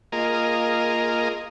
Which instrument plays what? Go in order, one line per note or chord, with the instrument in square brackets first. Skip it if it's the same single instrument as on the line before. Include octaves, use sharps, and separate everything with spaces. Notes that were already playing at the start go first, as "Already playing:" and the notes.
[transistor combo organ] A#3 F4 G#4 A#4 D#5